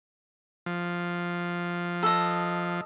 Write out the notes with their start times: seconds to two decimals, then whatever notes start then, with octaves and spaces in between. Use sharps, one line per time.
0.66 F3
2.03 A4 D#5